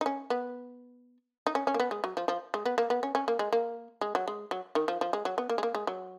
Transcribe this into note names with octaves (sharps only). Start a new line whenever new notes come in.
D#4
C#4
B3
D#4
C#4
C#4
A#3
B3
G#3
F#3
F3
F3
G#3
B3
A#3
B3
C#4
C#4
A#3
G#3
A#3
G#3
F#3
G#3
F#3
D#3
F3
F3
G#3
F#3
B3
A#3
G#3
A#3
G#3
F#3